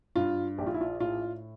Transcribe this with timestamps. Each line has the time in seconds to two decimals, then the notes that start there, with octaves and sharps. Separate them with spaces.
0.16 G2 F4
0.58 A#1 G4
0.67 F4
0.74 E4
0.81 F4
1.00 A2 F4